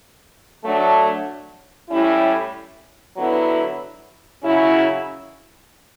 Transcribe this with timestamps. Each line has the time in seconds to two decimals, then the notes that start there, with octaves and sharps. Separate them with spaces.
0.64 F#3 A3 D4
1.89 A2 G3 C#4 E4
3.16 D3 F#3 B3 E4
4.42 C#3 F#3 C#4 E4